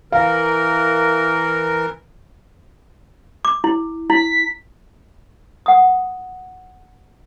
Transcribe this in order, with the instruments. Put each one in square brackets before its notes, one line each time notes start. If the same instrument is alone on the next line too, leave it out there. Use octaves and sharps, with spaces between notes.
[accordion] E3 A#4 [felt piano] F5
[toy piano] D6
E4
[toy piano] E4 [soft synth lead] B6
[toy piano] F#5 D#6